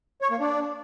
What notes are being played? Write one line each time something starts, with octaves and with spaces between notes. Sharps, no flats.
C#5
A#3
D4